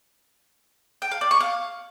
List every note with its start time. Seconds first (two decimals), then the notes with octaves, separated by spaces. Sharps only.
1.02 G5
1.12 F5
1.21 D5
1.31 C#6
1.40 F5